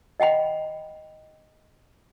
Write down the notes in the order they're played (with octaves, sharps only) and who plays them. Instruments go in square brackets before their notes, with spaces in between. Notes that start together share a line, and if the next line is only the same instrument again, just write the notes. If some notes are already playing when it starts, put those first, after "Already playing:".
[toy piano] D#5 F#5 G5 B5